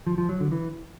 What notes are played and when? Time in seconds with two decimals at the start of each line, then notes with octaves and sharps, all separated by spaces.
0.07 F3
0.18 F3
0.29 F#3
0.40 D3
0.52 E3